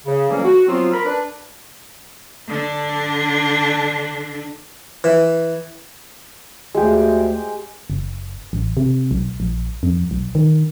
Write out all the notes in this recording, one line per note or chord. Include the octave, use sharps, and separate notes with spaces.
C#3
F2 E3 F#3 G3 A#3 C#4
F#4
F3 F#3 B3 C4 F4
A#4 B5
D4 B4
D3 D4
E3
D2 G#3 G4
F#1
A1
C3
B1
A#1
F2
B1
D#3